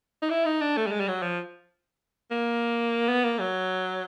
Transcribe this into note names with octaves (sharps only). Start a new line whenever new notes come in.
D#4
E4
D#4
D4
A3
G3
G#3
G3
F#3
F3
A#3
B3
A#3
F#3